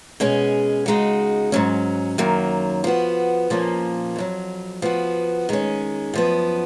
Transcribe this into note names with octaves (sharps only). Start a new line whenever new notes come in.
B2 G#3 C#4 G#4
C#3 G#3 D#4 F#4
G#2 F#3 C#4
F#2 D#3 F#3 A#3
F3 B3 F#4
A#2 F3 A#3 C#4
F2 D#3 F#3
F3 B3 F#4
D#3 G#3 C#4
F#2 F3 B3